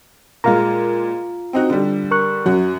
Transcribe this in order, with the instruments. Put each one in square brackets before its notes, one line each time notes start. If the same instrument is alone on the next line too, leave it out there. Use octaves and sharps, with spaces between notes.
[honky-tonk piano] A#2 G#3 [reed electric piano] F4 F5 A#5
[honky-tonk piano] C4 D#4 F#4
D3 G3
[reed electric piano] A#4 C#6 F#6
[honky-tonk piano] F#2 F#4 [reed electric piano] F#3